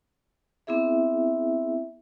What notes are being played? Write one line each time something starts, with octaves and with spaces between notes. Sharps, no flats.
B3 C4 E4 G#4 E5